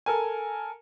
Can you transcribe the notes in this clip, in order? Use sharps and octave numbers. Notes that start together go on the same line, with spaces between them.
A4 A#4 G#5